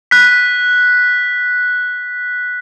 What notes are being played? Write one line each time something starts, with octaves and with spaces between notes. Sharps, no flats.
F#6 B6